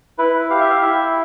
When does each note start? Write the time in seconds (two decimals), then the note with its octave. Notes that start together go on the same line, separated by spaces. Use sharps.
0.18 E4 B4
0.50 G4 F5
0.60 E5
0.70 F5
0.82 E4 E5